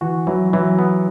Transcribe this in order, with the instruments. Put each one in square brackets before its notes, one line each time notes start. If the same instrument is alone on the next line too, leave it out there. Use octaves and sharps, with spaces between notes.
[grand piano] E3 [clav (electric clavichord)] F#4
[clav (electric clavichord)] E3 [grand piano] F#3
[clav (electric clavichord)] E3 [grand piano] F#3
[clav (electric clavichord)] B3